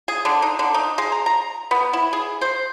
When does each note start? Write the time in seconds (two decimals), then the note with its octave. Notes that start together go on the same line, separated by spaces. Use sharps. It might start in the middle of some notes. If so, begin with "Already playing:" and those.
0.08 G#4
0.25 D3
0.42 D#4
0.59 D3
0.74 D#4
0.98 G#3
1.12 A#5
1.26 A#5
1.71 B3
1.93 E4
2.13 G#4
2.41 C5